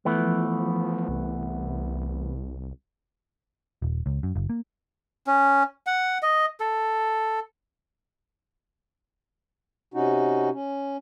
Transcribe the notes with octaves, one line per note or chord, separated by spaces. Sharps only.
E3 F3 A3 B3
C2
D#1
C#2
F#2
F#1
A#3
C#4
F#5
D#5
A4
C3 C#4 D#4 F#4
C#4